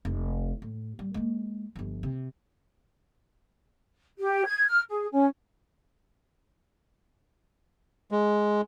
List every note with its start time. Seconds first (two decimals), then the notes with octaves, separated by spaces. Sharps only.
0.05 F1
0.62 A2
0.99 G3
1.14 G#3 A#3
1.76 G1 F3
2.03 C3
4.20 G4
4.46 G#6
4.67 F6
4.90 G#4
5.12 C#4
8.11 G#3